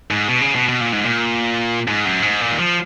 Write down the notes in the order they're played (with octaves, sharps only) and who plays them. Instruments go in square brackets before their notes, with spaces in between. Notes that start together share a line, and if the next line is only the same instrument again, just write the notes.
[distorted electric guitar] G#2
B2
C#3
B2
B2
A#2
G#2
A#2
G#2
F#2
G#2
A#2
D#3
F3